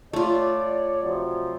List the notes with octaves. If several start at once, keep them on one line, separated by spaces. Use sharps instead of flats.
A3 F4 C#5 D5
C3 F3 F#3